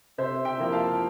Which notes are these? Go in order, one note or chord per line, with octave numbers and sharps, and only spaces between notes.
C3 C5 E5
E5 G5
F3 A#3 E4
F5 A5